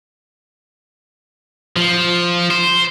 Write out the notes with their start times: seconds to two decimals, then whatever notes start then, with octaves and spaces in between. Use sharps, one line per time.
1.77 F3
2.51 C5